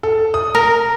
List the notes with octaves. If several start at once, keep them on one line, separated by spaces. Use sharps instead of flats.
A4
D#6
A#4